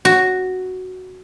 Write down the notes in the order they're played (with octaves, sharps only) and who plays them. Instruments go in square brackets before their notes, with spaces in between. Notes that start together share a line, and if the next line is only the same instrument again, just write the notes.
[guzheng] F#4